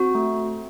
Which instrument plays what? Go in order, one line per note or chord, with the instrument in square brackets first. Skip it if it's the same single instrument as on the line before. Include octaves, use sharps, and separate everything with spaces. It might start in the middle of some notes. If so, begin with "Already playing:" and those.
Already playing: [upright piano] C4 [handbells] F#4
[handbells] A3